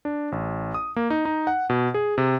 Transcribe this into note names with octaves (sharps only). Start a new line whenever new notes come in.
D4
A1
D#6
A#3
D#4
D#4
F#5
B2
G#4
C3